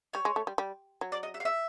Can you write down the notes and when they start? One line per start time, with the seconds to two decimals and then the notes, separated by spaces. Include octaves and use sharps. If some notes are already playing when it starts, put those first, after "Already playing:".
0.13 G3 C#5
0.25 G#3
0.36 A3
0.47 G3
0.58 G3
1.01 F#3
1.12 D5
1.23 D#5
1.34 E5
1.40 F5
1.45 E5